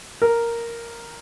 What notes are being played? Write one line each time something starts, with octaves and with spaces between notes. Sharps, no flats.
A#4